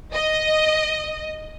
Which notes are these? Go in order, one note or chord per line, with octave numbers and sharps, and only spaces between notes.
D#5